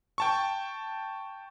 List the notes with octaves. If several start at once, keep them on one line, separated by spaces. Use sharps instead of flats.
G5 A5 C#6